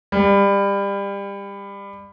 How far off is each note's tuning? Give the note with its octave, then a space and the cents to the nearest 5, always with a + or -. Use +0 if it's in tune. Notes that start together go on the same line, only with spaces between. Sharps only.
G3 +25